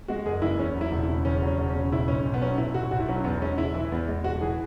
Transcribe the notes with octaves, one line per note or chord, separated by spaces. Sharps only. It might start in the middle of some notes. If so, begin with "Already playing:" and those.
G#3 F#4
F#1 G#4
E3 E4
E2 C#4
F#3
E4
E1
E4
C#3
E2 C#4
F#3
C#4
E1
C#4
C#3
B2 E4
B1 C#4
B1
B3
F#3 C#4
B2 E4
B1 F#4
B1 F#4
E4
F#3 C#4
E2 B3
G#3 C#4
E1 E4
E3 E4
E2 B3
G#3
E1 F#4
E3 G#4